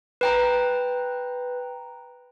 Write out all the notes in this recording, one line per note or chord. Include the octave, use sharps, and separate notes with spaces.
B4 G5 A#5